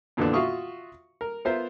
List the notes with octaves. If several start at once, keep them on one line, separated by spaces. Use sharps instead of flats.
F2 A#2 D3 E3 B3 D4
F4 F#4 E5 F5 C#6 D#6
A#4
B3 F4 A#4 C5 E5